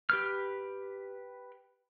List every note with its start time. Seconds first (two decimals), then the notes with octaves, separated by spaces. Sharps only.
0.10 G4 B4 F6